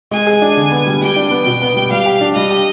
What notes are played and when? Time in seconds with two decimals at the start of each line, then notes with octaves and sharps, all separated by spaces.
0.11 G#3 G#5
0.27 G#4
0.42 D4
0.57 D3
0.71 B3
0.87 G3
1.02 G3 G5
1.16 D4
1.31 B3
1.46 B2
1.62 B3
1.76 G3
1.91 G3 F5
2.06 G4
2.21 D4
2.36 G3 D#5
2.50 G4